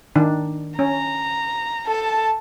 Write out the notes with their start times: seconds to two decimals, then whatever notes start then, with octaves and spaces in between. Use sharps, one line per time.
0.16 D#3 D4
0.79 C#4 A#5
1.86 A4 A5